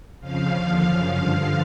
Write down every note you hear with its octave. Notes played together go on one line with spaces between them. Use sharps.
F2 C#3 F3 F5
D#2 D3 F3
F#2 C#3 F3
G2 D3 F3